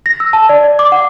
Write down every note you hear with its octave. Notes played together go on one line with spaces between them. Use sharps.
A#6
E6
A5
D5
D5
D6
F#5